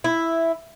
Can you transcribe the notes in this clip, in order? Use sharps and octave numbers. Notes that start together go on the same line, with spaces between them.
E4